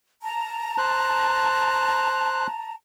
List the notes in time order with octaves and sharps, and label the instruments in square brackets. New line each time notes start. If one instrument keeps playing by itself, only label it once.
[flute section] A5 A#5
[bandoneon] C5 F#6